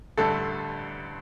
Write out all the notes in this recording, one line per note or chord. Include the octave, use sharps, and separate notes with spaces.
A1 G2 D3 A3 A4